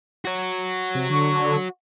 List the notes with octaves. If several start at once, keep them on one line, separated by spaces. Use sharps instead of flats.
F#4 C#5
C3
D3 C#6